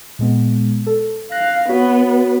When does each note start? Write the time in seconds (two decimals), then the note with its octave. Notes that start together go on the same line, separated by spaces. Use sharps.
0.19 A#2 G#3 B3
0.87 A4
1.32 F5 F#6 A#6
1.69 B3 F#4 C#5 B6